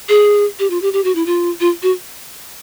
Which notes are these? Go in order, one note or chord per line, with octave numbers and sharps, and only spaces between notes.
G#4
G4
F4
G4
G4
F#4
E4
F4
F4
F#4